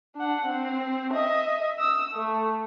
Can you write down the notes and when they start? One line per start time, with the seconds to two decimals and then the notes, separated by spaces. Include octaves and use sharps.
0.16 D4 F#5
0.46 C4
1.11 D#5 E5
1.79 D#6 E6
2.13 A3